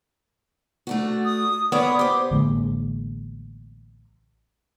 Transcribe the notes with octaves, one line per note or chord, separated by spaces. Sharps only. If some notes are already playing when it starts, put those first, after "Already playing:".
A3 D4 F#4
D#6
B3 A#4 C#5 D5 D#6
G4 C5 D6
A1 D3 G#3 A#3